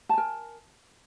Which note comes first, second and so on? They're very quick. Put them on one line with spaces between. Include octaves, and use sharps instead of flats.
A5 G#5 A#4